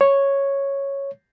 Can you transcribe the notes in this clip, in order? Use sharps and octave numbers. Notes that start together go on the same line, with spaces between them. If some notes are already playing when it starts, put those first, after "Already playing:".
C#5